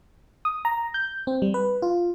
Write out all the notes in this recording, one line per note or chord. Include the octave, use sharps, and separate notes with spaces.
D#6
A#5
G6
C4
G3
B4
F4